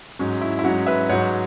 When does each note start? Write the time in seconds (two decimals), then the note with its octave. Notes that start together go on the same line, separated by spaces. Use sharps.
0.19 G#2 F#3 C#4
0.41 E4
0.59 E4
0.64 G#2 F#3 C#4 F#4
0.86 B4 E5
1.09 G#2 F#3 C#5 F#5